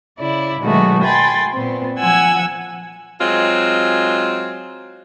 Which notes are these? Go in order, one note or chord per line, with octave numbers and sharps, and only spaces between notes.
C#3 E4 D5
B2 D#3 F#3 G#3 A3 F#4
G5 G#5 B5 C6 A6
A#2 B3 C4
F3 F#5 G#5 E6 G#6
F#3 G#3 C4 F4